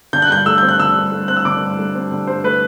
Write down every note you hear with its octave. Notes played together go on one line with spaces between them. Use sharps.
D3 G6
F#6
G2 G6
A3 E6
C4 G6
F#6
D3 E6
G2
A3
C4 F#6
E6
D3 D6
G2
A3
C4
D3
G2 C5
A3 B4